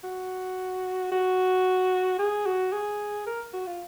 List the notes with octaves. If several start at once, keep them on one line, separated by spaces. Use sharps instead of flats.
F#4
F#4
G#4
F#4
G#4
A#4
F#4
F4